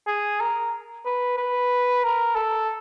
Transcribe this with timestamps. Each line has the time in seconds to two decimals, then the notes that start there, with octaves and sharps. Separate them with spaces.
0.07 G#4
0.41 A#4
1.05 B4
1.38 B4
2.03 A#4
2.36 A4